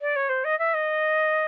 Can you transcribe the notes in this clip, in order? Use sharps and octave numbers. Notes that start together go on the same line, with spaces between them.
D5
C#5
C5
D#5
E5
D#5